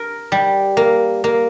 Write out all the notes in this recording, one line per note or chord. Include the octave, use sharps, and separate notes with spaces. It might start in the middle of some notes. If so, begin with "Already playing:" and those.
Already playing: A#4
G3
A#3
A#3